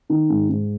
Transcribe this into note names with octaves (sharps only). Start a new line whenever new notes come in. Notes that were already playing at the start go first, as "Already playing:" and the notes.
D#3
G#2
G#2